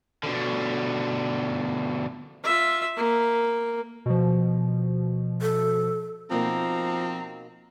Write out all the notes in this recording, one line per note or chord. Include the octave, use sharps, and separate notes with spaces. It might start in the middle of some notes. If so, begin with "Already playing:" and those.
B2 D3
F4 E5
A#3
B2 F3
A4
B2 F3 A#3 C4 D#4 A#5